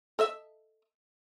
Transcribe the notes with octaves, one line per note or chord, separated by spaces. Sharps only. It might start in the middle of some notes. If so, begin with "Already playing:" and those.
A4 D#5 E5